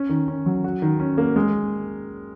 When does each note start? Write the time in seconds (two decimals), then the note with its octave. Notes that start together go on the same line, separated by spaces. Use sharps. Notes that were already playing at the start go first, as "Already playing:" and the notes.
Already playing: C#4
0.09 D#3
0.28 C#4
0.46 F#3
0.64 F#4
0.82 D#3
0.99 C#4
1.18 A#3
1.36 G#3